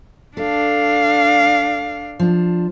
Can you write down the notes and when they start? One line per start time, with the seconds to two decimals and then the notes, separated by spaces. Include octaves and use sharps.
0.37 D4 A4 F5
2.20 F3 D4